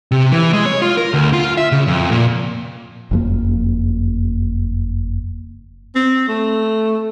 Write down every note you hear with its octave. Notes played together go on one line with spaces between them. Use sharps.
C3
E3
G#3
C#5
F4
A#4
D2
F4
E5
C#3
F2
A#2
F#1 F2 A#3
C4
A3